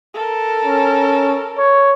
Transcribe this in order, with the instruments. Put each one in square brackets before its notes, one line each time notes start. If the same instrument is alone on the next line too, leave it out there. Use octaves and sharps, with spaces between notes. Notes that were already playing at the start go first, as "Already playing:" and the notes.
[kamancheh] A4 A#4
[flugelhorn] C#4
C#5